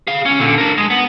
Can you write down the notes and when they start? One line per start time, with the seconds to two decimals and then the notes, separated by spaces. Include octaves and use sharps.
0.07 G#4 F5
0.26 C#2 C#4
0.40 A#2 D3
0.58 D4 A#4
0.78 G#3
0.90 B3